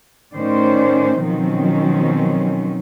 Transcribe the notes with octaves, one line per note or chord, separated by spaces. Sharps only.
A2 D#3 C#4 C5 D5
B2 D#3 F3 F#3 C4 C#4